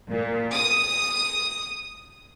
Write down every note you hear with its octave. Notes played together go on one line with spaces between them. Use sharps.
A#2
D#6